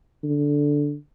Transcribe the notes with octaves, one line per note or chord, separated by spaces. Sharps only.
D3